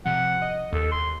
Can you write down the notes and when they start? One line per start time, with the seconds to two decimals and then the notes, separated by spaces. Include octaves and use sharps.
0.05 C3 F3 F#5
0.42 D#5
0.73 D#2 A4
0.91 C6